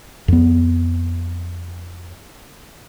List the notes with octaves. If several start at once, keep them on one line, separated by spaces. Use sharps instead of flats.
F2 B3